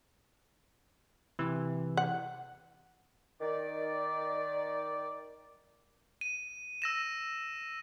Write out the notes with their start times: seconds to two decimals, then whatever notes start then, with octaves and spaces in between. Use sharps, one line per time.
1.39 C3 E3
1.97 F#5
3.41 D#3 D5
6.21 D#7
6.82 E6 A#6 E7